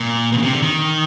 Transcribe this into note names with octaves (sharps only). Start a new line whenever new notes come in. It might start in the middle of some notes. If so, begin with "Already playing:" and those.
Already playing: A#2
B2
C#3
C3
D3
D#3